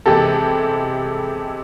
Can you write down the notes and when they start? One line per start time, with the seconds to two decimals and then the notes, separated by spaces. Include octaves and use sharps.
0.06 C3 E3 G#3 G4 A4